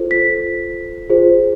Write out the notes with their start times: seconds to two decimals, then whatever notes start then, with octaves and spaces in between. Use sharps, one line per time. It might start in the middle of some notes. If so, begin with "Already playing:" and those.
Already playing: F4 A4 C5
0.11 B6
1.09 F4 G#4 C5